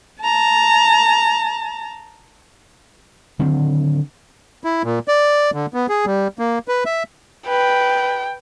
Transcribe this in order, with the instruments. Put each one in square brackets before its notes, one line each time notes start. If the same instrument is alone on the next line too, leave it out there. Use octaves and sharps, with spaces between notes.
[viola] A5 A#5
[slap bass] D3 D#3 F#3 C4
[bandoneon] E4
A#2
D5
D3
B3
G#4
G3
A#3
B4
E5
[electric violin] B4 [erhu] G5